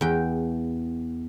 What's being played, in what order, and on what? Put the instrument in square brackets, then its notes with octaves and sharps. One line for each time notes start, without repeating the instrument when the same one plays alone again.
[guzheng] E2 G5